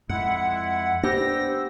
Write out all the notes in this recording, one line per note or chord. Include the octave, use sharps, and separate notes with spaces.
F2 G#3 E4 F#5
B3 D4 G4 C5 E6 A#6